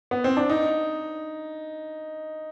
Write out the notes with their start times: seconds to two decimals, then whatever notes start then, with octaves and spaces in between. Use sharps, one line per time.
0.11 B3
0.24 C4
0.37 D4
0.49 D#4